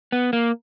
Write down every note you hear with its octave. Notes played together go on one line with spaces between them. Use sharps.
B3
A#3